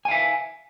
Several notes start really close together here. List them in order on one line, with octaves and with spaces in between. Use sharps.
G#5 F5 E5